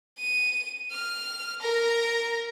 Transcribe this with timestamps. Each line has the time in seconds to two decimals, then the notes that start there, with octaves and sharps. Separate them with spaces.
0.19 D#7
0.91 F6
1.61 A#4 A#5